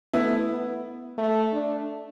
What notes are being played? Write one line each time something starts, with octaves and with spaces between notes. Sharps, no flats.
A3 B3 E4
B3
A3
D4